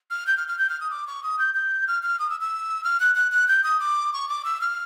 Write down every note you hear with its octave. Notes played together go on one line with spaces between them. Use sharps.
F6
G6
F6
F6
G6
F6
D#6
D6
C#6
D#6
G6
G6
F6
F6
D#6
E6
E6
F6
F#6
F#6
F#6
G6
D#6
D6
C#6
D6
E6
F6